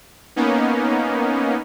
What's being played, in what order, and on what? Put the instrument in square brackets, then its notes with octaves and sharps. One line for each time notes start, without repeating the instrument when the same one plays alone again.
[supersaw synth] A#3 B3 C#4 D#4